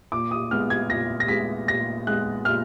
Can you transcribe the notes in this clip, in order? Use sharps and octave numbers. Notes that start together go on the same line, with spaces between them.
A#2 D6
D#6
G#3 B3 F6
G#6
A#2 A#6
A#6
G#3 B3 B6
A#2 A#6
G#3 B3 F#6
A#2 F6